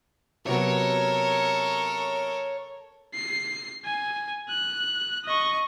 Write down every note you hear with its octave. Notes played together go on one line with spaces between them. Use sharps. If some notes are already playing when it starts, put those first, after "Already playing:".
C3 F#3 B3 A4 A#4 C#5
C7
G#5
F#6
D#5 C#6